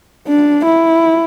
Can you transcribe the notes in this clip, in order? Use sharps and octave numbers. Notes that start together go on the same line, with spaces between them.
D4
E4